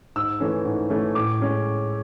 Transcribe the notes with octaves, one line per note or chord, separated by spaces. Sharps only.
G#2 E6
E3 A3 C#4
G#2
E3 A3 C#4
A2 D6
G#3 C#4